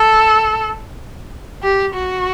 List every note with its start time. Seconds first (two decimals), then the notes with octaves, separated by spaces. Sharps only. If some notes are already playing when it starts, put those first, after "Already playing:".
Already playing: A4
1.63 G4
1.95 F#4